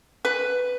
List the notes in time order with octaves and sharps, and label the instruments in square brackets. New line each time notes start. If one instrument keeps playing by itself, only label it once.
[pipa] B4